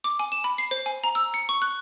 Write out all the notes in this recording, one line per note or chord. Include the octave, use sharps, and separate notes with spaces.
D6
G#5
E7
B5
C7
C5
G#5
A#5
E6
C#7
C#6
F#6